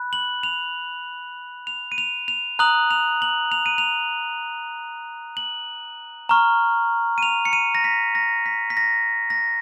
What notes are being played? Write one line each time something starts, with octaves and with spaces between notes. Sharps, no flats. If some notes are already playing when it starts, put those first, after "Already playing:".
Already playing: B5 F#6
F#7
F7
F7
D#7
F7
F7
A#5 D#6 F#6 F#7
F7
F#7
F7
D#7
F7
F#7
A#5 C#6 F6
D#7
F7
C#7
D#7
A#6
B6
A#6
B6
B6
A#6
A#6